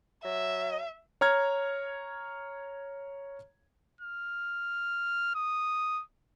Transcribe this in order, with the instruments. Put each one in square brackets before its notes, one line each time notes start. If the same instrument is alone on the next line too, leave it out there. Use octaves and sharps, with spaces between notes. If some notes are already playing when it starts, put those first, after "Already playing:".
[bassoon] F#3 [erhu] E5
[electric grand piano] C#5 A#5 F6 G#6
[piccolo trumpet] F6
D#6